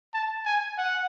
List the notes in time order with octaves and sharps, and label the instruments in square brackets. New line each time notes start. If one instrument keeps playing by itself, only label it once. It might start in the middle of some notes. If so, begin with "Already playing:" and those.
[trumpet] A5
G#5
F#5